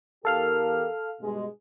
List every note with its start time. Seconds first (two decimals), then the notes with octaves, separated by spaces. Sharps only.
0.25 E2 G4 A4 A#4 F5 F6
1.21 G2 B2 G#3